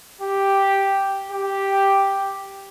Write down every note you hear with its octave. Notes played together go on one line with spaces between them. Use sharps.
G4
G4